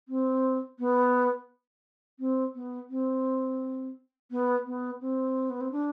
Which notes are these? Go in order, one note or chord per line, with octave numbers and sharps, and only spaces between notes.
C4
B3
C4
B3
C4
B3
B3
C4
B3
C4
D4